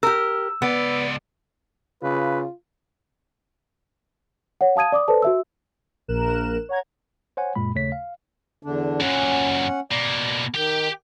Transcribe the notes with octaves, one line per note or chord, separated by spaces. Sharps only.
G4 A#4 E6
C#2 B3 D5
C#3 F4 B4
C#5 F#5
F5 A5 D#6 G#6 D#7
D5 D6 D#6
A4 B4 C5 D5 A5
F#4 E5 E6
A#1 A#4 F#6 E7
C#5 F#5 A#5 G#6
C5 C#5 F#5 G#5
F#2 A#2 G#3 B5
D#2 C#3 A3 C#5 B6
F5
E2 D3 D4
F#2 A#2 C#4 F#5
B2 A#3 D5
D#3 G4 G5